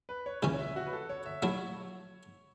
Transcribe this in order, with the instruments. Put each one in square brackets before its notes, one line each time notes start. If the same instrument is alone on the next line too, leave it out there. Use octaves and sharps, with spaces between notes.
[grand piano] B4
C#5
[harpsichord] C#2 C#3 E3 C#4
[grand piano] C#5
E5
F#4
B4
A4
C#5
E5
[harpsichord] F#3 A3 E4 [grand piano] C#5